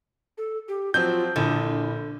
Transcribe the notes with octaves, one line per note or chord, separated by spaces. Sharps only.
A4
G4
F3 F#3 C4 F4 G6
A#1 D3 E4